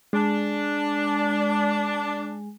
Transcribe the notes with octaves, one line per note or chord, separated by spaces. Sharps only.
G#3 D4